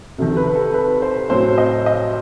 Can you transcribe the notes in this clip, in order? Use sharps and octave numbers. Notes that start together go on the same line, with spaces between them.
C2 C3 D#3 A4
B4
A4
B4
C5
A2 F#3 C4 C5
D#5
D#5